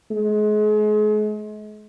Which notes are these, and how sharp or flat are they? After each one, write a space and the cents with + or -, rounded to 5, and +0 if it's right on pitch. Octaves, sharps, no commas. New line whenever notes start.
G#3 +35